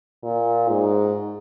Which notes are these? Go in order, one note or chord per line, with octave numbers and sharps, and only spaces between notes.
A#2
G#2